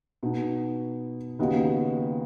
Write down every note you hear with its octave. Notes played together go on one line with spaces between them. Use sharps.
B2 B3 D#4 F#4
D#2 C#3 B3 F#4 D#5